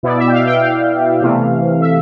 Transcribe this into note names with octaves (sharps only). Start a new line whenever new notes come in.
B2 B3 E4 D5
E5
G5
F5
G5
F5
C3 E3 A3
E5